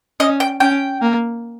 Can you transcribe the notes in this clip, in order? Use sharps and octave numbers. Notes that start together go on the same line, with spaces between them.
C#4 D#5
G5
C#4 G5
A#3